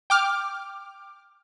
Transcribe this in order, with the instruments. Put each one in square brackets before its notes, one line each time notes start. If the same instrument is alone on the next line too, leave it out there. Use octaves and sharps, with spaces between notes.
[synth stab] G5 D6 F6